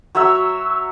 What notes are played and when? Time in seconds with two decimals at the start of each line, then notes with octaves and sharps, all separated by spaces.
0.15 F#3 C#5 E5 E6